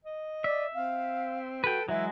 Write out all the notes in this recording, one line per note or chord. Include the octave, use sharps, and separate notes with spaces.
D#5
D5 E5
C4 F5
F#4 A4 B4 G5
E3 F#3 G#3 E5